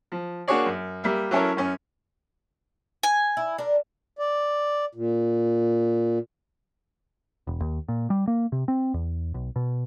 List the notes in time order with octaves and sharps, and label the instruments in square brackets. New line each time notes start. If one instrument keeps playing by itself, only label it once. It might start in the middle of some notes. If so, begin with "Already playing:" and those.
[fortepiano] F3
A#3 D4 F#4 G#4 C#5 D5
F#2
G3 A#3 A#4 E5
F#3 C#4 E4 A4 A#4 C#5
F#2 C#4
[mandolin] G#5
[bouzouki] E4
D4 A#4
[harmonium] D5
A#2
[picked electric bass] E1
D#2
A#2
G3
A#3
C3
C4
E2
B1
B2